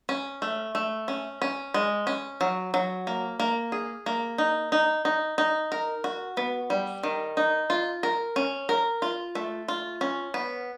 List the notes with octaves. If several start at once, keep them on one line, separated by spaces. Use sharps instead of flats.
C#4
A3
A3
C#4
C#4
G#3
C#4
F#3
F#3
A#3
A#3
G#4
A#3
D#4
D#4
D#4
D#4
A#4
F#4
B3
G3
D#3
D#4
F4
A#4
C#4
A#4
F4
A3
F4
C#4
B3